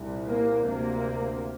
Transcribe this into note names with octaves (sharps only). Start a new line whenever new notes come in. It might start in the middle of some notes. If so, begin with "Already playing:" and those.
Already playing: C2 A#2
A#3
D2 C3 A#3